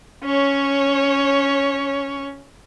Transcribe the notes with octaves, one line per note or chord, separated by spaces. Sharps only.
C#4 C#5